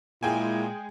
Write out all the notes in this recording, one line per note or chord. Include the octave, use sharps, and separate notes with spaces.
A#2 G#3 E4 G#4 G5 G#5